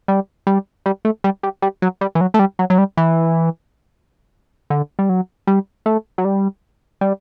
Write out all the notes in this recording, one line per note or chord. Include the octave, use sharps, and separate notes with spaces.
G3
G3
G3
A3
G3
G3
G3
F#3
G3
E3
F#3
A3
G3
F#3
F#3
G3
E3
D3
G3
F#3
G3
A3
F#3
G3
G3